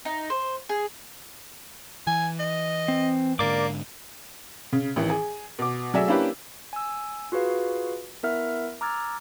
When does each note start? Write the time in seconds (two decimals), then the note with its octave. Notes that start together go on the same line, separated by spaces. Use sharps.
0.05 D#4
0.30 C5
0.69 G#4
2.07 E3 G#5
2.39 D#5
2.88 C4
3.39 G#2 D3 A#3 A#4 D5 D6
4.73 C#3
4.96 A1 D#3 E3
5.10 G#4
5.59 B2 D6
5.94 F#3 A3 G#4 D5 E5 E6
6.08 A#3 C#4 D4 E4 G4 B4
6.73 G#5 E6
7.32 F4 F#4 G#4 B4 F5
8.23 B3 E4 A#4 E5 F#5 F6
8.81 A#5 D6 E6 F6 G#6 A6